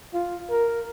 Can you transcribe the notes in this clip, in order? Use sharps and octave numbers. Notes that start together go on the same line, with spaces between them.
F4
A#4